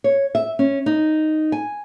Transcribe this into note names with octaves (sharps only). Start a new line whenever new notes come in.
C#5
E5
C#4
D#4
G#5